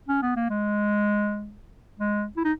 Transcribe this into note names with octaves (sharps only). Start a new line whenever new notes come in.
C#4
B3
A#3
G#3
G#3
E4
D#4